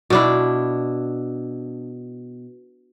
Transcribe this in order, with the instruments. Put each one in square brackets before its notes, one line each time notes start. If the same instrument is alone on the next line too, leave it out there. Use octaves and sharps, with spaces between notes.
[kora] B2 D4 E4